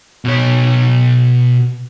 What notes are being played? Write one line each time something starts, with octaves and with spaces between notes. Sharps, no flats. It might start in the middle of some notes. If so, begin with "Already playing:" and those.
B2 C#5